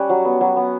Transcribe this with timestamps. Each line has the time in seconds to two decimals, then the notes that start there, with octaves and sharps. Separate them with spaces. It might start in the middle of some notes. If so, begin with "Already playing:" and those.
Already playing: G3 C#4 F#5
0.09 F#3
0.25 B3
0.41 F#3
0.56 B3